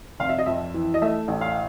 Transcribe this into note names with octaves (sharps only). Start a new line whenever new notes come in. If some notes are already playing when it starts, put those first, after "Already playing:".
F1 F5
E5
D#5
F2 E5
E3
D#5
A3 E5
A1
F5